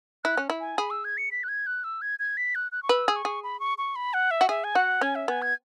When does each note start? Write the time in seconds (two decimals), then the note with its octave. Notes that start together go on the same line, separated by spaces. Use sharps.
0.24 E4 F#6
0.37 C#4
0.50 E4
0.60 G#5
0.78 G#4 B5
0.91 E6
1.05 G#6
1.17 C#7
1.31 B6
1.44 F#6
1.48 G#6
1.67 F#6
1.84 E6
2.02 G#6
2.19 G#6
2.37 B6
2.55 F#6
2.72 F#6
2.83 C#6
2.89 B4 E6
3.08 G#4
3.16 C#6
3.25 G#4
3.43 B5
3.60 C#6
3.78 C#6
3.96 B5
4.14 F#5
4.31 E5
4.41 F#4
4.49 G#4 E5
4.64 G#5
4.75 F#4 F#5
5.01 C#4 G#5
5.15 E5
5.28 B3 G#5
5.42 G#6